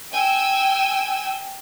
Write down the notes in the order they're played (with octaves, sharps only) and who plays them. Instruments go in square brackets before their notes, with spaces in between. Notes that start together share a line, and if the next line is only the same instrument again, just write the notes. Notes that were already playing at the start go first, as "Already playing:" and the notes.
[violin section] G5 G#5 E6